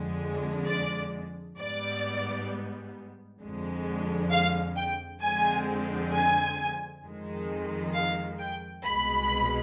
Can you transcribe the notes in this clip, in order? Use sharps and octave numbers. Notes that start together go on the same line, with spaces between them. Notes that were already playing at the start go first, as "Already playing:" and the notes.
Already playing: F2 D3 G#3
D5
G#2 G3 B3 D5
F2 D3 G#3
F5
G5
F2 D3 G#3 C4 G#5
G#5
F2 D#3 G#3
F5
G5
C2 B2 G#3 B5